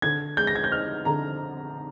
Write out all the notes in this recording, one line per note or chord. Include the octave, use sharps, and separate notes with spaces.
D3 G#6
G#3 G6
A#6
G#6
G6
D#4 F6
D3 A#5